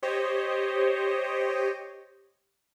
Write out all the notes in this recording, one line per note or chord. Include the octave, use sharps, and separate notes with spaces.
G4 C5 C#5 D#5